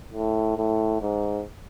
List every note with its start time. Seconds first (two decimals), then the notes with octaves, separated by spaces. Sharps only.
0.13 A2
0.57 A2
1.01 G#2